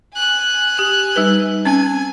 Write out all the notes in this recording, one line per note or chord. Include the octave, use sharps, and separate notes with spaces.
G#5 F#6
G4
G3 D#4 B4
C4 C#4 G#5